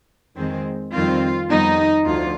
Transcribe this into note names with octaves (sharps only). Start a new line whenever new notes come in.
F2 D#3 G#3 C4
F2 D#3 G3 C4 F4
F2 D#3 G3 B3 D#4
D2 D3 F3 F4